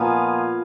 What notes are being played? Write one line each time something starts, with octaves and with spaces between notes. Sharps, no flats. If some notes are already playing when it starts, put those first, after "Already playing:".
Already playing: A#2 F3 B3 F5 G#5